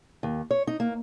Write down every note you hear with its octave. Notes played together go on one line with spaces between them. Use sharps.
D#2
C#5
D#4
A#3